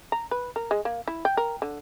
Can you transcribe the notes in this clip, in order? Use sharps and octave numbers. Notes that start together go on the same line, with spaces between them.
A#5
B4
A#4
G#3
A#3
E4
G5
A#4
D3